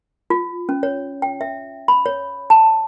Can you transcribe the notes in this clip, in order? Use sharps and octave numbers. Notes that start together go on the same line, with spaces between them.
F4
C#4
C#5
G5
E5
B5
C#5
A5